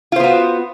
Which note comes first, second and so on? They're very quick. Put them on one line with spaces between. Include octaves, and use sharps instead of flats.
F4 C5 B3 F#4